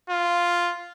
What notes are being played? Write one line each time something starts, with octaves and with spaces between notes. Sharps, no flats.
F4